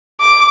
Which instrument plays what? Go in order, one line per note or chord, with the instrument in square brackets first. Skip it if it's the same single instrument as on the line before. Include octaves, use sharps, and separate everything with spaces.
[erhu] D6